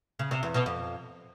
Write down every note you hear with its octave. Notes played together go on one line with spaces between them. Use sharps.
C#3
C3
E2
B2
F2